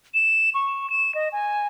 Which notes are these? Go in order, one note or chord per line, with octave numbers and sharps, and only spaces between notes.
E7
C#6
E7
D#5
G#5